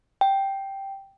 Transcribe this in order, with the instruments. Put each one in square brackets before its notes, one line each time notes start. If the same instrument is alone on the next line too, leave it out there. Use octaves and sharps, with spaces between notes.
[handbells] G5